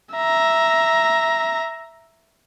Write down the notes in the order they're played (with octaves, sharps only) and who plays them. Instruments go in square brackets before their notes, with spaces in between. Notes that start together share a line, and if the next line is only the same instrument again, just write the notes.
[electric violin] E5 A#5